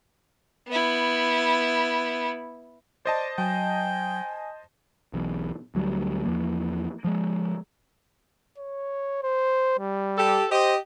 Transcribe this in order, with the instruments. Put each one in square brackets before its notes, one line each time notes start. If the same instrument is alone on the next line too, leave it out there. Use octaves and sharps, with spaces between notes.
[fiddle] B3 E4
[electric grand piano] C5 D#5 A5 [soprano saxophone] D5
[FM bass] F#3 [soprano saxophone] G5 [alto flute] G#5
[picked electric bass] E1 B1 E2
D2 F#3 G3
E2 F3 A#3
F3 G#3
[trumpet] C#5
C5
G3
[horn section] G4 A4
[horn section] G4 D#5 [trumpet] C5